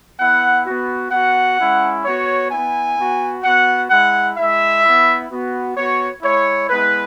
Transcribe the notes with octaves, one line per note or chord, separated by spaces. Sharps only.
B3 E4 F#5
B3 F#4
B3 F#4 F#5
G#3 C#4 E4
B3 F#4 C#5
B3 E4 G#5
B3 F#4
B3 F#4 F#5
G#3 E4 F#5
G#3 E4 E5
B3 E4
B3 F#4
B3 F#4 C#5
G#3 E4 C#5
G#3 B3 E4 B4